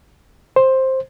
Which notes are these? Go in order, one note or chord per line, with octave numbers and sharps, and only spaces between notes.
C5